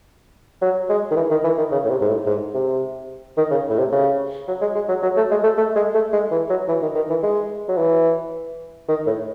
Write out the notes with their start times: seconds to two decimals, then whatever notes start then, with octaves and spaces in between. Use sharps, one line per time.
0.62 F#3
0.89 G#3
1.11 D#3
1.16 E3
1.31 D#3
1.44 E3
1.58 D#3
1.72 C#3
1.85 A2
1.90 C3
2.01 G#2
2.09 A2
2.26 G#2
2.54 C3
3.37 D#3
3.51 C#3
3.69 A2
3.78 C3
3.92 C#3
4.47 F#3
4.61 G#3
4.75 G#3
4.89 F#3
5.03 F#3
5.17 A3
5.31 G#3
5.44 A3
5.58 A3
5.76 G#3
5.95 A3
6.13 G#3
6.31 E3
6.50 F#3
6.68 E3
6.82 D#3
6.95 D#3
7.09 E3
7.23 G#3
7.68 F#3
7.78 E3
8.88 D#3
9.07 A2